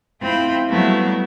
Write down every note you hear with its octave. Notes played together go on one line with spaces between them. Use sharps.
A3 C4 E4 F4 B5
F#3 G3 A3 B3 E4